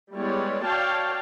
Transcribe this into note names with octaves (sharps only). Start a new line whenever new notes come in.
G3 G#3 B3 E4 C#5 D5
F#4 C#5 D5 F5 G5 A5